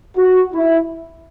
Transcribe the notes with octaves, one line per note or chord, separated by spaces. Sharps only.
F#4
E4